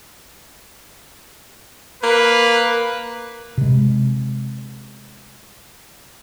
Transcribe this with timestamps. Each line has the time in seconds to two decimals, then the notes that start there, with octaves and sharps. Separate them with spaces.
2.03 A#3 B4
3.58 C3 G#3